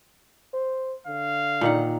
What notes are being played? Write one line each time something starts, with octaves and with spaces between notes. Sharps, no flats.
C5
D3 F5
A#2 D#3 F#5